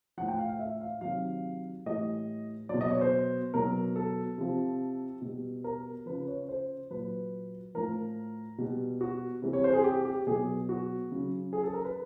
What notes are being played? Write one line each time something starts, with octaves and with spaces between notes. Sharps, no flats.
A2 F3 F#5
G5
F5
F5
E5
F5
C3 D#3 F#3 F5
A2 E3 G3 D#5
B2 F#3 D5
D#5
C#5
C5
B2 F#3 A#4
A4
C3 F3
B2
G3
A#4
C#3 F3 B4
C#5
C5
A#2 F#3 B4
A2 F3 A#4
B2 G3
F#4
C3 E3 G3
C#5
C5
G#4
G4
G4
B2 F#3 G#4
F#4
C#3 F#3
G#4
A4
A#4
B4